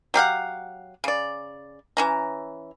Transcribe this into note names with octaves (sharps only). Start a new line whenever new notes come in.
F#3 G4 F5 F#5
C#3 D5
E3 C#4 A#5